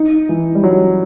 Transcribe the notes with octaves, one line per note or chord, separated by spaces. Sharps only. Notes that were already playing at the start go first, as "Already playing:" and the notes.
Already playing: D#4
E3
G3
F#3